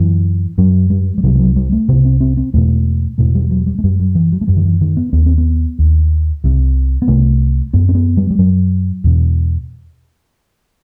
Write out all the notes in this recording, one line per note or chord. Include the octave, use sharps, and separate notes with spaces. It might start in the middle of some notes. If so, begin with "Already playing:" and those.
Already playing: F#2 E3
F#2 F#3
G3
G3
C2 C3 F#3
G3
F#3
G3
A3
C2 C3 B3
C4
C4
C4
E2 B2 A3
E2 B2 A3
G3
F#3
G3
A3
F#2 G3
F#3
E3
F#3
A3
F#2 G3
D#3
E3
D#3
B3
D#2 B3
C4
B3
D#2
C2 C3
B3
C2 C3 A3
F#2 B3
C4
B3
G3
G3
F#2 F#3
E2 B2